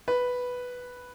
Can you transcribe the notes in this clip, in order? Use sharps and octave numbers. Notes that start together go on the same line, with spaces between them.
B4